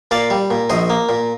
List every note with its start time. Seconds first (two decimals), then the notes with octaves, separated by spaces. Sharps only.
0.11 A#2 D5 F5
0.30 G3
0.51 A#2
0.70 A#1 C5 D#5
0.90 A#3
1.09 A#2